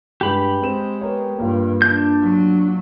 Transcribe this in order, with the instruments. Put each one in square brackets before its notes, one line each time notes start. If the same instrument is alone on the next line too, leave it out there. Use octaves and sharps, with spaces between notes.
[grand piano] G2 G#3 [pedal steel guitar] G4 B5
[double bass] G#3 [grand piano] C4 E7
[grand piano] B3 A#4 C#5
[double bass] G2 [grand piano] A#3 F4
[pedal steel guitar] D4 G6
[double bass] F#3